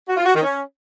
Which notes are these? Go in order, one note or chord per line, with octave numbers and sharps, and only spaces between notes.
F#4
F4
F#4
D#3
C#4